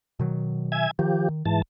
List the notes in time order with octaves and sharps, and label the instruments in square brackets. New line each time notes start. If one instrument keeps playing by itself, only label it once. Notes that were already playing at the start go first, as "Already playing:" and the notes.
[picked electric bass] B2 D#3 F#3
[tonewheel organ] E5 G#5 G#6
[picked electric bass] D#3 [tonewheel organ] F3 G4
[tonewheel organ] G#2 E3 A5